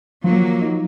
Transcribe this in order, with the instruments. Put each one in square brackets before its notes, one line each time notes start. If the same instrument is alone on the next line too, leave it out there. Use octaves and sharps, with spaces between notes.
[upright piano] F3 [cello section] F#3 A#3
[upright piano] D#4